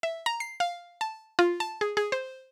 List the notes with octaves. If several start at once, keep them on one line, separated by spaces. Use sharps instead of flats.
E5
A#5
C7
F5
A5
F4
A5
G#4
G#4
C5